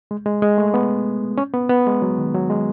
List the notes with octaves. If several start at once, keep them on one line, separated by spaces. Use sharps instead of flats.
G#3
G#3
G#3
A3
B3
C#4
B3
B3
G#3
F#3
D#3
F#3
G#3